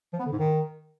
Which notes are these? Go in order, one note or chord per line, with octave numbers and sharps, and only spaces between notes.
F3
B3
D3
G#2
D#3